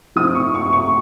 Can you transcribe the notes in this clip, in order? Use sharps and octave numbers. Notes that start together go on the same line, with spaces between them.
F3 C4 D#4 D#6
C#6
C#6
C#6